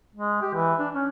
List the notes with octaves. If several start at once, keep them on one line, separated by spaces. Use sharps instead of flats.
G#3
G4
E3
D4
C#4